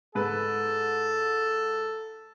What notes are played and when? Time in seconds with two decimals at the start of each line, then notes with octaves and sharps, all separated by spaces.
0.15 G#2 A4 B4